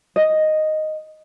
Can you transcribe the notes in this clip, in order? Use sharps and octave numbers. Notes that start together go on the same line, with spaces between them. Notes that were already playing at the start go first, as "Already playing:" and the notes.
D#5